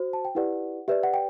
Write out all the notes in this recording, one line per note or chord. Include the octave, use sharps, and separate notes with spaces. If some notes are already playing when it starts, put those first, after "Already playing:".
Already playing: F#4 C5
A5
G5
E4 G4 B4 D5 F#5
G4 B4 D5 E5
F#5
G5